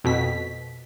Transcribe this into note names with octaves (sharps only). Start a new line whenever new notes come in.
F2 B2 B6